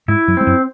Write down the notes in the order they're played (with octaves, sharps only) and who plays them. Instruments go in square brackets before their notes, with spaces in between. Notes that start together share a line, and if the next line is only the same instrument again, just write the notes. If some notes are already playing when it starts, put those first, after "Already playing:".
[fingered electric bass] G#2 G#3 [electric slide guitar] E4
[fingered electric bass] F#2 F#3
[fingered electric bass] G#3 [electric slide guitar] C4
[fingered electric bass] F#2 F#3